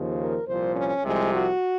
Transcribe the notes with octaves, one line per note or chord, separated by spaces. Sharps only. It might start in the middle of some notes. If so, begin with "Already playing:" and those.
Already playing: D#2 C#3 F3
A#4
C2 A#2 F3 C5
C#4
C2 C3 F3 G#3
F#4